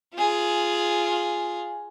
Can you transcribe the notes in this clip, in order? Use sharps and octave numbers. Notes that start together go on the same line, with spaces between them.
F4 G#4